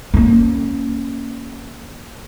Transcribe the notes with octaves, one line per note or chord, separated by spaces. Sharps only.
A#3 C#4